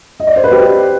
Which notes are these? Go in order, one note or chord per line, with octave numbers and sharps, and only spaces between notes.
D#5
D5
C5
B4
G4